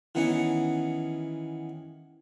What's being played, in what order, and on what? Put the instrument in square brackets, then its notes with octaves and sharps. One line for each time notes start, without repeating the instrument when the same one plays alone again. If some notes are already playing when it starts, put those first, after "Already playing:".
[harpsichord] D#3 E3 B3 C#4